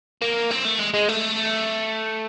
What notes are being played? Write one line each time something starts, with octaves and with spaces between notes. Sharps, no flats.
A#3
C4
A3
G#3
G#3
A3